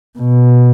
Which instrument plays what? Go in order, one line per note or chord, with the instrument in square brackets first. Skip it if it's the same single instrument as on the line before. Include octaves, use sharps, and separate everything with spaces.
[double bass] B2